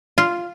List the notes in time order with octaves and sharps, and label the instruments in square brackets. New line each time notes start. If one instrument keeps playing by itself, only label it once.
[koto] F4